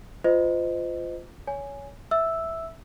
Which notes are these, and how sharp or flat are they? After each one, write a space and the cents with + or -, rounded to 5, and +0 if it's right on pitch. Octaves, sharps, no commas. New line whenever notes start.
F4 +0 C5 -35 D#5 +0
C#5 +20 G#5 +0
E5 -5 E6 +0